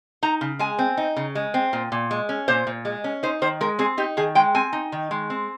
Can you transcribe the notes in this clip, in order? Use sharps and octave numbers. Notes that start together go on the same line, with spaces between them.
D#4 A#5
C#3
G#3 G#5
C4
D#4
C#3
G#3
C4
A#2
A#2
G#3
C#4
A#2 C5
A#2
G#3
C#4
D#4 C5
D#3 C5
G#3 A#4
C4 G#4
D#4 G4
D#3 G#4
G#3 G5
C4 G#5
D#4
D#3
G#3
C4